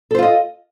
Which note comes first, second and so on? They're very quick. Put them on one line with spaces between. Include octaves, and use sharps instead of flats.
A4 C5 F4 D#5